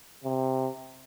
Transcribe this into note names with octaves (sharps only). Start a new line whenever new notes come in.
C3